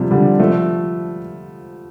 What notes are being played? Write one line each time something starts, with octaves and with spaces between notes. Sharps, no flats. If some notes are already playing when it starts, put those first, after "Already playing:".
Already playing: C3 F3 G3
D3 G3
F3 A3